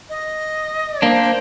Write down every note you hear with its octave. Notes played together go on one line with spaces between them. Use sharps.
D#5
A#3 D4 C5